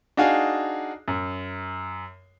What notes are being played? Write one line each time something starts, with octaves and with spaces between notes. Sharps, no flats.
D4 D#4 F#4 G#4 F5
F#2